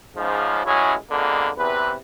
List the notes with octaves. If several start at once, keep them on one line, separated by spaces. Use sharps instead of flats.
G#2 C#3 F3
A1 F#3 G#3 C#4 E4 G#4
F2 D3 G#3 A#3 B3
E2 C3 B4